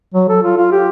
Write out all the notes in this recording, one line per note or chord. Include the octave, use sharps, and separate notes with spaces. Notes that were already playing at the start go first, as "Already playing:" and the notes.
F#3
A4
F4
F4
G4